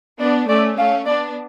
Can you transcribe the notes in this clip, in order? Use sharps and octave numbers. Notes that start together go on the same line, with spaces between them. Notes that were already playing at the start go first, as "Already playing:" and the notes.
B3 D4 D5
A3 C#4 D5
A3 C#4 F5
B3 D4 D5